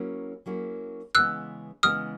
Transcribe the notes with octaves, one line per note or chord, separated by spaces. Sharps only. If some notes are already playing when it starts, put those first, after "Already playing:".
Already playing: F#3 A#3 C#4 E4 G#4
F#3 A#3 C#4 E4 G#4
C#3 E3 G#3 B3 E6 F#6
C#3 E3 G#3 B3 D#6 F6